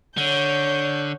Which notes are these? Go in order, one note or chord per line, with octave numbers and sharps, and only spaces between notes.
D3 C#5 G6